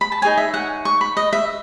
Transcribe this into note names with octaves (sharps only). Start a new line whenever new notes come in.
B5
A5
D#4 G#4 C#5 G#5
E5
F#5
C#6
B5
D#5
E5